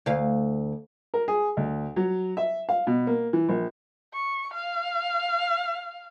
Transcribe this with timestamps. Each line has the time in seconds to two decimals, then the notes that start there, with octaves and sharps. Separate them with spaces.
0.06 D2 F5
1.14 A#4
1.28 G#4
1.57 D2
1.96 F#3
2.37 E5
2.69 F5
2.87 B2
3.07 A#3
3.33 E3
3.49 A#1
4.13 C#6
4.53 F5